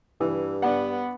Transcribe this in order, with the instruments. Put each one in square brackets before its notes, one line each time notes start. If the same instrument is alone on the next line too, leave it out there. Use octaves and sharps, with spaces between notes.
[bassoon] G2 [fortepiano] E3
[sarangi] B3 [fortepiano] D4 F#5